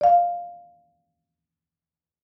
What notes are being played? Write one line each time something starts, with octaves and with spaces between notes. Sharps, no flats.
D5 F5